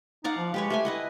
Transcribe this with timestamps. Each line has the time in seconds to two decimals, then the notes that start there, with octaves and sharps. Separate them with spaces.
0.24 D#4 D5 F5 F#5
0.37 F3
0.54 G#3 G4 B4 C#5
0.70 G3 A3 C5 G#5
0.85 E4 B4 D#5 F#5